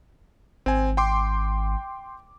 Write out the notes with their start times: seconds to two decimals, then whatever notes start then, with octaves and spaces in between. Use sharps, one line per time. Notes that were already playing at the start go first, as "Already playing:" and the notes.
0.66 G#1 C4 G#5
0.97 G5 C6 D6